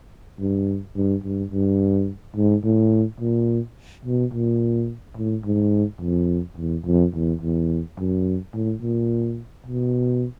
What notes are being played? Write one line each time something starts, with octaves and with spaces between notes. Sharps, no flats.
G2
G2
G2
G2
G#2
A2
A#2
B2
A#2
A2
G#2
F2
E2
F2
E2
E2
F#2
A2
A#2
B2